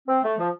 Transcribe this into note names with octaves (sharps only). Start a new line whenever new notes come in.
C4
A3
F3